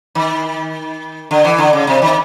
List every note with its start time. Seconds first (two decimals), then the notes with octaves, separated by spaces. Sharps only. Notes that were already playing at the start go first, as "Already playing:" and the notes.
0.15 D#3
1.31 D3
1.45 E3
1.58 D3
1.73 C#3
1.87 C3
2.02 D#3